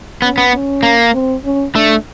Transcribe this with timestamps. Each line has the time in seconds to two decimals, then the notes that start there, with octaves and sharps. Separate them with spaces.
0.22 B3 C#4
0.38 B3
0.53 C#4
0.83 A#3
1.13 C4
1.45 C#4
1.75 A3 D4